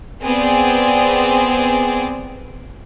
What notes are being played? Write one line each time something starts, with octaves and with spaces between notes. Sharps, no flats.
B3 C4 G#4 D5